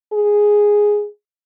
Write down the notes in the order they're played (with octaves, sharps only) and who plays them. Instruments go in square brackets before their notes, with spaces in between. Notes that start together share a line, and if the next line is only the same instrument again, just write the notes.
[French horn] G#4